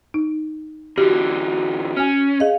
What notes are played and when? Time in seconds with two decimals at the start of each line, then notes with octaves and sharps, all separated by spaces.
0.14 D#4
0.98 D3 E3 F#4 G4
1.97 C#4 G#5 F6
2.40 G#4 D#5 F5